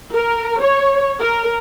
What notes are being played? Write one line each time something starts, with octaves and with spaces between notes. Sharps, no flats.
A#4
C#5
A#4